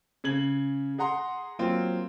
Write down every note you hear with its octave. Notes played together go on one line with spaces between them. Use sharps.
C#3 G#6 F#7
G#4 F#5 A#5 C6
F#3 A#3 C4 F4